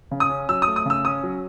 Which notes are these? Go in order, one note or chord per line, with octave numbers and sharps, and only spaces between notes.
C#3
D#6
C#4
F#3 E6
D#6
A3
D#6
C#3 E6
C#4 D#6
F#3